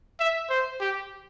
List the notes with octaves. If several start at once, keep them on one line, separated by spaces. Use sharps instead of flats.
E5
C5
G4